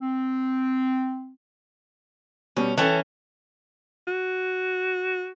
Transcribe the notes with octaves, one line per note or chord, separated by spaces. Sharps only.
C4
B2 G3 C#4
E3 C#4 A4 G5 A5
F#4